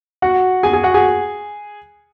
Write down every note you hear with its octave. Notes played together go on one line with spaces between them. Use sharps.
F#4 F#5
G#4 G#5
G#4 G#5
F#4 F#5
G#4 G#5